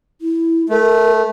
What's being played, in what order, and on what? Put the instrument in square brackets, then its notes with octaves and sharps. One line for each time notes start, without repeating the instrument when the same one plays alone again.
[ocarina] E4
[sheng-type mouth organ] A3 [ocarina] A#4